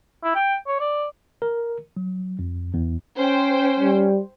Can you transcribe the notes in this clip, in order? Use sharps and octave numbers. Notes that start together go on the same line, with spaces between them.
E4
G5
C#5
D5
A#4
F#3
F2
E2
C#4 C5 G5
G3